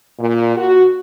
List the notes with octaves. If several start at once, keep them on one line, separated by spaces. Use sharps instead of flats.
A#2
F#4